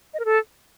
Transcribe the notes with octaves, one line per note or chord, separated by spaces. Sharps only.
D#5
A#4
A4